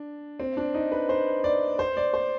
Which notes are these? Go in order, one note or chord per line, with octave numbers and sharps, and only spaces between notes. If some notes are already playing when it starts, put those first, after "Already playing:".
Already playing: D4
C4
D4
D#4
B4
C5
D5
C5
D5
C5